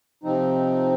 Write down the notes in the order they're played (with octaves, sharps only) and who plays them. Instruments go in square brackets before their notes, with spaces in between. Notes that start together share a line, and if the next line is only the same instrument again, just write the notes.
[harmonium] C3 F3 C4 D#4